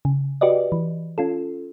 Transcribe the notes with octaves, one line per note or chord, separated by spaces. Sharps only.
C#3
F#4 G4 B4 D5 D#5
E3
C#4 F4 A4